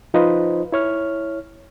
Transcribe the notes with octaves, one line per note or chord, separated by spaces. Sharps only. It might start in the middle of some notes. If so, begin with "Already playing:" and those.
F3 D#4 F4 B4 C5 D#5
E4 C#5 F6